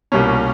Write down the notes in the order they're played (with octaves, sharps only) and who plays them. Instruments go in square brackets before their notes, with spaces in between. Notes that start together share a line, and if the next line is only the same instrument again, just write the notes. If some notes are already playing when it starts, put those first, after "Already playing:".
[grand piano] C2 B2 G3 A#3 C#4 [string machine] F4 G4